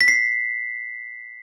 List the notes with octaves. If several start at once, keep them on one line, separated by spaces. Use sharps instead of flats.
B6
C7